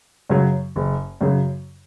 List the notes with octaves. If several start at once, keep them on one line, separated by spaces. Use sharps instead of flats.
F#2 C#3 F#3
F#1
F#2 C#3 F#3